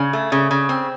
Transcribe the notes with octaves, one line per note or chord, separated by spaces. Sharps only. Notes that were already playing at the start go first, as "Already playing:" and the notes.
Already playing: C#3
A3
C#3
C#3
C4